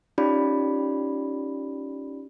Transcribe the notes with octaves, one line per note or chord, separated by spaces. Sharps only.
C#4 D#4 F4 G4 D5 B5